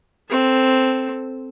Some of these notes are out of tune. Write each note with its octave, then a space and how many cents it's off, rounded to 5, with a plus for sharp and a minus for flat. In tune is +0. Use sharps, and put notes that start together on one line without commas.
C4 +0 A4 +0